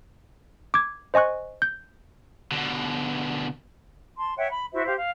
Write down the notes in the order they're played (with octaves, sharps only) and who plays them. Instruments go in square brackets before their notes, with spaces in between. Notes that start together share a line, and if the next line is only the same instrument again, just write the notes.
[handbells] D6 G#6
C5 D#5 G#5 C#6 F#6
G6
[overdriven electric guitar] B2 D3
[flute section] A5 C6
C#5 E5 F#5 G5
B5
E4 F#4 C5 E5
G4 C5 F5
F5